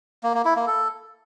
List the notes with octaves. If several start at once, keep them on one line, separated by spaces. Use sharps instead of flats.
A#3
A#3
E4
A#3
A4